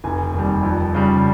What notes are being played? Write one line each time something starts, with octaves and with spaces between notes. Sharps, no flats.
F1 G#5
D#2 D#3 G3
F2
C#3 G3